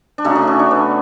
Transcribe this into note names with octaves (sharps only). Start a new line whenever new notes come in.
D4
C#3 F#3 A3 D#4
D4
C#4
D4
B3